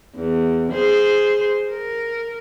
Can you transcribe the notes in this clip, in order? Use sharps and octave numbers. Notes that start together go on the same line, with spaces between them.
E2
G#4 C5
A#4